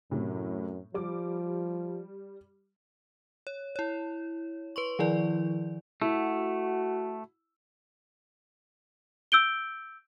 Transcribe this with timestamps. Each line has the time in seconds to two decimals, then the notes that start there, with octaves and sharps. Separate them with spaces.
0.11 F#2 A2 C3
0.94 F3 G3 D6
3.47 C#5
3.76 E4 C#5
4.76 B4 C6 C#6
4.99 D#3 F3 E4 D5
6.02 A3 E4 F#4
9.32 E6 G6 D7 G7